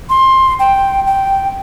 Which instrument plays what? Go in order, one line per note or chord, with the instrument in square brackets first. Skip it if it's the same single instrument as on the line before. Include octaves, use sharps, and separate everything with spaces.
[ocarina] C6
G5
G5